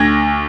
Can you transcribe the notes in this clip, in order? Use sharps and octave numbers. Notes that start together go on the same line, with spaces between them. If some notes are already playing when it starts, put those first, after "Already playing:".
Already playing: D2 G#6 A#6